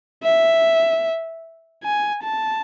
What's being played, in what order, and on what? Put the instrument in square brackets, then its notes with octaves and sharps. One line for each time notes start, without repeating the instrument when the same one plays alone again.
[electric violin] E5
G#5
A5